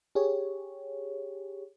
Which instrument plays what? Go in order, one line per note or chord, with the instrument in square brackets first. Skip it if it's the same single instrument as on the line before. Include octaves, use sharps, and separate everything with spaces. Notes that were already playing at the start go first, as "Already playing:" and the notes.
[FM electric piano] G4 G#4 C#5